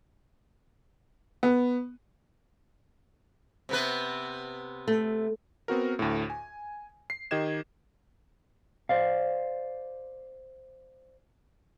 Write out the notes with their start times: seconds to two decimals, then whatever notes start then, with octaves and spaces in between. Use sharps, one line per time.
1.43 B3
3.69 C3 B3 B4
4.88 A3
5.68 B3 C4 F#4 A#4
5.99 D2 A2
6.30 G#5
7.10 C7
7.31 D#3 G4 D#5 G#6 E7
8.89 C5 D5 F5